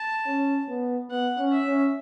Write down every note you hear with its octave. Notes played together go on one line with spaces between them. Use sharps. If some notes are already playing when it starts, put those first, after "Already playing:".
Already playing: A5
C#4
B3
B3 F#5
C#4
E5
C#4